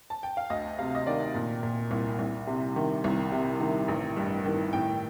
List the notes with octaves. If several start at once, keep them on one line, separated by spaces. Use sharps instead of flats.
A5
G5
F5
D2 D#5
C3 F5
D#5
D#3 D5
A#2
A#2
C2
C2
C3
D#3
C2
C3
D#3
A1
G2
D#3
A2 G5